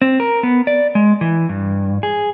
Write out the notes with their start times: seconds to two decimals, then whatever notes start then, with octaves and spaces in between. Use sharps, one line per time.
0.02 C4
0.20 A#4
0.43 B3
0.67 D5
0.95 G#3
1.21 E3
1.49 G2
2.03 G#4